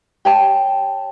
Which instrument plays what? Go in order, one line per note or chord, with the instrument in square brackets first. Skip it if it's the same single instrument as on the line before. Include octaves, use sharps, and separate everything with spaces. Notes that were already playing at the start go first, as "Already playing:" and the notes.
[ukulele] G4 C#5 A5